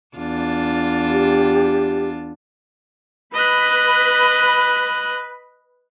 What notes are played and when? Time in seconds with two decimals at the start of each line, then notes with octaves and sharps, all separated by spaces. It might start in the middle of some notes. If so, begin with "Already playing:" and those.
0.17 E2 D4 F4
1.10 G4
3.34 B4 D#5 B5 F#6